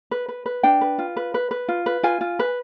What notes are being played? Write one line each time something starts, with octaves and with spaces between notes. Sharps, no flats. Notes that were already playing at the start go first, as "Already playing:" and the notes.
B4
B4
B4
D4 G5
B4
F4
B4
B4
B4
F4
B4
F4 G#5
F4
B4